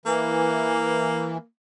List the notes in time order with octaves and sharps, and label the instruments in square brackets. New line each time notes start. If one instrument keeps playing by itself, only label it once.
[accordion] E3 [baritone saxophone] A#3